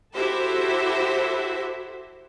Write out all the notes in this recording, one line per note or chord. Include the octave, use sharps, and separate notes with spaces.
E4 F#4 G4 A4 C5 E5